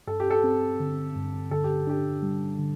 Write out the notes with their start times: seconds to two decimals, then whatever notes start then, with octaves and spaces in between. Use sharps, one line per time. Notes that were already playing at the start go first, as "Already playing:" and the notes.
0.07 G2 A4
0.20 G4
0.31 A4
0.44 C4
0.80 D3
1.15 G2
1.51 D3 A4
1.64 G4
1.87 D4 G4
2.23 G3
2.59 D3